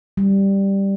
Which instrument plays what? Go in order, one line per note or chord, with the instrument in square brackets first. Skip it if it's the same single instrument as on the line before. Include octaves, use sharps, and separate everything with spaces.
[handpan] G3